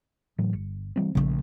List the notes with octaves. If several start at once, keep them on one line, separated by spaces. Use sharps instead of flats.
A2 E3 F#3
G1
E3 G3 C4
A#1 C#3 F3 A3